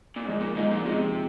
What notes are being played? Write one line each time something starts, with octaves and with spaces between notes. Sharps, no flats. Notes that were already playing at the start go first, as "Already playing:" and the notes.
A#2
G#2 F3 G#3 D#4
A#2
G#2 F3 G#3 D#4
A#2
C3 F3 G#3 D#4